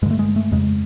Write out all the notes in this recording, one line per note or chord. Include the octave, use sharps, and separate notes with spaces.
G2 D3 G#3 A3
G#3
A3
F2 C#3 G#3